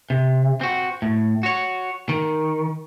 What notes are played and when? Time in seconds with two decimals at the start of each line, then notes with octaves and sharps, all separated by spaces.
0.10 C3
0.61 C4 F#4
1.02 A2
1.43 F#4 C#5
2.09 D#3